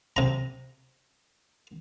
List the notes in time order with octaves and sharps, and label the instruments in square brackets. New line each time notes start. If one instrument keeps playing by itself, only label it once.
[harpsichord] C3 A#5